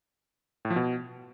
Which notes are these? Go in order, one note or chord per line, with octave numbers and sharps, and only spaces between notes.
A2
F3
B2